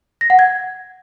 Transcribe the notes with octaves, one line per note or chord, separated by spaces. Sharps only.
A#6
F#5
G#6